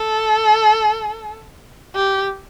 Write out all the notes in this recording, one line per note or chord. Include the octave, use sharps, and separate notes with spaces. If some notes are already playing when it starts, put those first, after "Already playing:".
Already playing: A4
G4